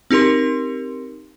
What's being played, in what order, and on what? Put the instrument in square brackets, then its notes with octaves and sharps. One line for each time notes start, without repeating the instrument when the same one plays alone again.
[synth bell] C4 D#4 G4 A#4 C6